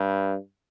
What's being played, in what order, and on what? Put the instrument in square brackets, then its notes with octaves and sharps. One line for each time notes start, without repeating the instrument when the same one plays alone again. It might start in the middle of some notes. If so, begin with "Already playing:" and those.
Already playing: [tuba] G2